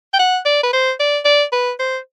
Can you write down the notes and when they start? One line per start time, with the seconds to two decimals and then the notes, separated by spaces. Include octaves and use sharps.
0.13 G5
0.19 F#5
0.45 D5
0.63 B4
0.73 C5
1.00 D5
1.25 D5
1.52 B4
1.79 C5